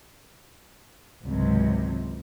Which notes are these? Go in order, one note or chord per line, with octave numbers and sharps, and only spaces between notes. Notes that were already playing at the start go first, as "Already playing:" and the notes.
G#1 C#2 C3 F#3